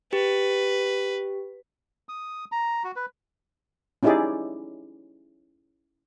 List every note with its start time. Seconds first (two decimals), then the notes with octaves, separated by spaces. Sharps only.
0.13 G4 B4
2.09 D#6
2.52 A#5
2.84 F#4
2.96 B4
4.03 C#4 D#4 E4 G4 G#4 D5